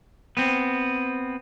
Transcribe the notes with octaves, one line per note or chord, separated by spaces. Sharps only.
B3 C4